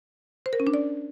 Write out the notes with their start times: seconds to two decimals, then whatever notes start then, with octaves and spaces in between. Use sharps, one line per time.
0.46 C5
0.53 A#4
0.60 C#4
0.67 D4
0.74 D5